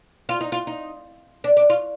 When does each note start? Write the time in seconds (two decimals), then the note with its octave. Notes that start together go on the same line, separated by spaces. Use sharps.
0.29 F4
0.41 D#4
0.52 F4
0.67 D#4
1.44 D4
1.57 D4
1.70 F4